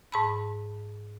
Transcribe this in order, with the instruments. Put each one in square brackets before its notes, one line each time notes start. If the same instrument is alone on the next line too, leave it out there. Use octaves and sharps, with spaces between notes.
[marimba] G#2 A5 B5